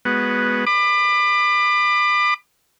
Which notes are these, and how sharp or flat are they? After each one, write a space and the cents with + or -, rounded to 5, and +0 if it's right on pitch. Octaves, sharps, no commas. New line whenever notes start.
G#3 +0 B3 -5 F#4 +0
B5 +15 D6 +35